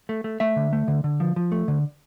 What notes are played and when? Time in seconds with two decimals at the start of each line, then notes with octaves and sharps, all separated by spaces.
0.09 A3
0.24 A3
0.40 A3 E5
0.56 D3
0.73 A3
0.88 D3
1.04 D3
1.20 F3
1.36 F3
1.52 A3
1.68 D3